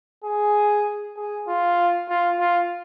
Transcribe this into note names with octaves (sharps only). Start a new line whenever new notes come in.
G#4
G#4
F4
F4
F4